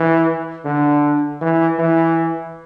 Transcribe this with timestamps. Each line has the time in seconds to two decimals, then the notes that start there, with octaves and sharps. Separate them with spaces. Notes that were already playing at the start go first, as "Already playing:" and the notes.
Already playing: E3
0.65 D3
1.41 E3
1.79 E3